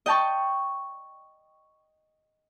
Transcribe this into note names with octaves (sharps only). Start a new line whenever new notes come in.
D#5 G5 A5 C#6